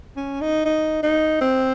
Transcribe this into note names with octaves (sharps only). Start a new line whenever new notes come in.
C#4
D#4
D#4
D#4
C4